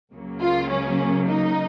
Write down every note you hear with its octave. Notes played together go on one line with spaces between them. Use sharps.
C#2 C#3 F#3 A#3
F4
C#4
D#4